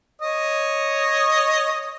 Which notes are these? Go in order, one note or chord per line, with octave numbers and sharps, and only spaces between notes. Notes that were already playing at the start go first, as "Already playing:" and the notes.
C#5 D#5 D#6